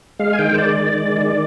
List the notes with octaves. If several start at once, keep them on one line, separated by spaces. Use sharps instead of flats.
G#3 F5
G#5
D#3 G5
C5
G#3 D5
D#3
G#3
D#3